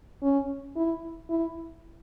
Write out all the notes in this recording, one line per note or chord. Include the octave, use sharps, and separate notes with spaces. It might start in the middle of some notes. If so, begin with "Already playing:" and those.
C#4
E4
E4